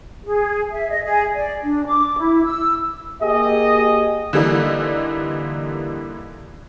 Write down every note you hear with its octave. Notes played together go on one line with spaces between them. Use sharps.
G#4
E5
D#5
G#4
D5
D4
D6
E4
E6
A#3 G4 G#4 D#5
D3 E3 G3 A#3 D#4